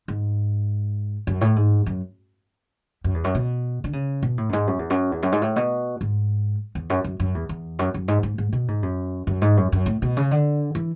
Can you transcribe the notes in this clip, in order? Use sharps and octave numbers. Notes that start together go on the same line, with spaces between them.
G#2
F#2
A2
G#2
F#2
F#2
E2
F#2
B2
D3
C#3
B2
A2
F#2
G#2
F#2
E2
F#2
E2
F#2
G#2
A2
B2
G#2
E2
F#2
F#2
F#2
E2
E2
F#2
F#2
G#2
G#2
G#2
B2
G#2
F#2
F#2
G#2
F#2
F#2
A2
B2
C#3
D3
E3